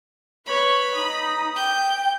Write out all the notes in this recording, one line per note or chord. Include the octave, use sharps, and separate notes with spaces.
B4 C#5 B5
D#4 D#6
G5 G6